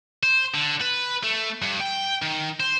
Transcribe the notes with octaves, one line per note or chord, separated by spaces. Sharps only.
C5
D3
B4
A3
G2
G5
D#3
C5